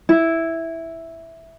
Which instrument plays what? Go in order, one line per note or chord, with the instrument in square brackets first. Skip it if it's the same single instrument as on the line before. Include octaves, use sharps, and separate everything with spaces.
[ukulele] E4